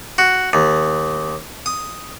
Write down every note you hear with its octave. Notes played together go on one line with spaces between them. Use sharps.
F#4
D#2
D#6